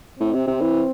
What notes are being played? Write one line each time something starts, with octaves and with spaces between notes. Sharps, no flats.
A2 C4
C3
C3
E3